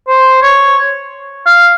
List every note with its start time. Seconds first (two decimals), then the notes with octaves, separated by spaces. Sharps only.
0.08 C5
0.42 C#5
1.46 F5